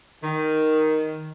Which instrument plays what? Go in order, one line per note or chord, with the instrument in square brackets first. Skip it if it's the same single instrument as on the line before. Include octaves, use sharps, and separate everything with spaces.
[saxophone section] D#3